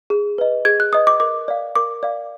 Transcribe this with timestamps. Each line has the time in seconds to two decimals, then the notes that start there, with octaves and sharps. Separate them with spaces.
0.10 G#4
0.38 B4 D#5
0.65 G#4 G#6
0.80 F#6
0.93 B4 D#5 D#6
1.07 D6
1.20 A#4 D6
1.48 D5 F5
1.76 A#4 D6
2.03 D5 F5